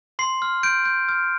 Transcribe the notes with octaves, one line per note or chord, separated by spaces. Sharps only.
C6 C7
F6
G6 D7
G6
F6